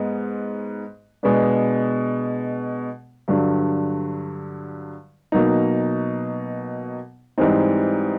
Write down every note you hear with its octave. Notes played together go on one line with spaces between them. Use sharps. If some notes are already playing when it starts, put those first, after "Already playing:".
Already playing: G#2 G#3 B3
B2 G#3 B3 D4
G2 D3 F#3
B2 F#3 A#3 D#4
G#2 E3 G3 C4 D#4